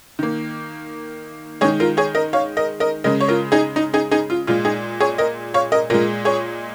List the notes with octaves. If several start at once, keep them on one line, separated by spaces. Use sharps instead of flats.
D#3 A#3
D#3 G#3 G#4 C#5
F4 A#4
G#4 C#5
A#4 D#5
C#5 F5
A#4 D#5
A#4 D#5
C#3 G#3 A#4 D#5
C#5
F4 A#4
D#4 G#4
D#4
D#4 G#4
D#4 G#4
F4
A#2 G#3 F4
D#4 G#4
G#4 C#5
A#4 D#5
C#5 F5
A#4 D#5
A#2 G#3 F4 A#4
G#4 C#5